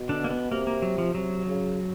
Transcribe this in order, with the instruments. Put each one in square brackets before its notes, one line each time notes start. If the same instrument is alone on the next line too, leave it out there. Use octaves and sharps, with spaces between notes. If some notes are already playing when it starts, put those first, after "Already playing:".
Already playing: [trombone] B2
[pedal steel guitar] D3 D4
A#3
B3
[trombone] C3 [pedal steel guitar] A#3
[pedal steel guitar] A#3
F#3
F3
[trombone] C3 [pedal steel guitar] F#3
[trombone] C#3